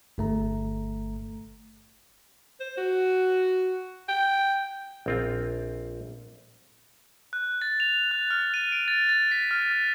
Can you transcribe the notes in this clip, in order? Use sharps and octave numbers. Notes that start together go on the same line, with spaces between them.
G1 A3 A#5
C5
F#4
G5
A#1 C4 F4
F#6
A6
F7
F#6
F6
D#7
D7
A6
A6
B6
F6